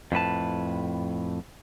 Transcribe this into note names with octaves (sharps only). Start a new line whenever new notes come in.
F2 A2 B4 A5